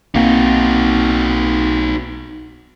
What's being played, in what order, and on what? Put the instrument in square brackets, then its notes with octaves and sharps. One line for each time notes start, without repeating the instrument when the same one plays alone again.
[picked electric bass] B1 A#3 C4 [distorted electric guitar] D#4 F#4